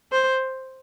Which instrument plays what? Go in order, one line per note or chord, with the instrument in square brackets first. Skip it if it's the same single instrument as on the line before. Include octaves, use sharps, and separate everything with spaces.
[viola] C5